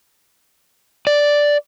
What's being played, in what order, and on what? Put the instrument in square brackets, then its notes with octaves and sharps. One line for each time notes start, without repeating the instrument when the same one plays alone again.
[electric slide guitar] D5